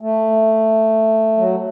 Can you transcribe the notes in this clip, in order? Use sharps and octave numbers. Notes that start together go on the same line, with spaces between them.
A3
F#3